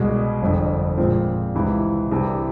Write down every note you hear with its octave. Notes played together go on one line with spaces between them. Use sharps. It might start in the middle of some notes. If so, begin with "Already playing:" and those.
Already playing: C2 B2 G#3
G1 F2 D3
A#2 F3 G#3 C4
C#2 C3 E3
C2 C3 E3